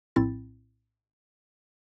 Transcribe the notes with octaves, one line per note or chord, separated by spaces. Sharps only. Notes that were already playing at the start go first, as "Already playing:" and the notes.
A#1 A2 C4 E4 A6